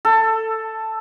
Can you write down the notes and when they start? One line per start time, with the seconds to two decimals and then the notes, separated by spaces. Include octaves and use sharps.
0.05 A4